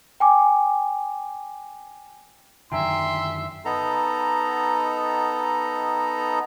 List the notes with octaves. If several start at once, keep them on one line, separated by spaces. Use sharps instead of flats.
G5 G#5 D6
F#2 D3 D#3 E5 G5 G#5 A#5 C6
B3 D#4 A4 A#5